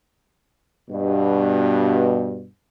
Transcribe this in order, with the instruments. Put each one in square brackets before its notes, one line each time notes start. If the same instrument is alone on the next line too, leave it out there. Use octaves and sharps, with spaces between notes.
[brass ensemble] G2 B2